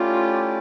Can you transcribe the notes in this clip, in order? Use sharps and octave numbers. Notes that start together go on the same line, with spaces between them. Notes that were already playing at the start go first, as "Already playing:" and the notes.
Already playing: A3 C#4 E4 F4 G4 D5